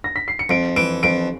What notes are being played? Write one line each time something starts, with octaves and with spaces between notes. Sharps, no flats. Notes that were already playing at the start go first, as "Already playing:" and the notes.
A#6
B6
C7
C#7
F2 D7
E3 D7
F2 D7